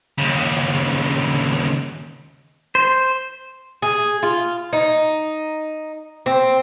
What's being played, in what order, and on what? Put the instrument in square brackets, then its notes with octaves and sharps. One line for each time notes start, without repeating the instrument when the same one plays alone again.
[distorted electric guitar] D#2 C#3
[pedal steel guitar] C5
[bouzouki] G#4
F4
D#4
C4